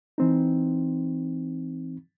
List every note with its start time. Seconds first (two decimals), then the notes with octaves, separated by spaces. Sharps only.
0.18 E3 C4 D#4